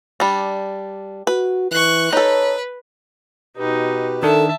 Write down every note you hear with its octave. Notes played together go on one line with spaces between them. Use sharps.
G3 D4
F#4 B4
E3 C#6 F#6
D#4 A4 B4 C#5
B2 D#4 G4 B4
D#3 D4 A4 E5 A5